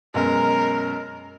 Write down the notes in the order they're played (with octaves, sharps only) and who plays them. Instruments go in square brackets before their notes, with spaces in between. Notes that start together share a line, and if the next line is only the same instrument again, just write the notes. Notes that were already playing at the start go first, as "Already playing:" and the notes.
[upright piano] F#2 B2 G#3 [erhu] A#4